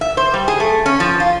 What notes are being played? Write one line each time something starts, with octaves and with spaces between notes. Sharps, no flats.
E5
C5
G3
G#4
A3
C#4
F3
F4